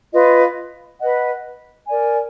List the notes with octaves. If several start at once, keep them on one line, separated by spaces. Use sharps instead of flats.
F4 B4 D#5
B4 D#5 F#5
A#4 D5 G#5